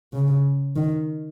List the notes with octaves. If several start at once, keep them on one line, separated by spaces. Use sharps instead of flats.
C#3
D#3